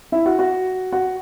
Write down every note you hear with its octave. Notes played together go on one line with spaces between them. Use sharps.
E4 E5
F#4 F#5
F#4 F#5
F#4 F#5